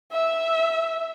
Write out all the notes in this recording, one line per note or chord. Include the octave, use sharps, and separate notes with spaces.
E5